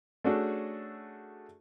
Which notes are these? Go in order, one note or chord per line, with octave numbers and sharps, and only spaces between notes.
A3 C#4 D4 F#4 G#4 A4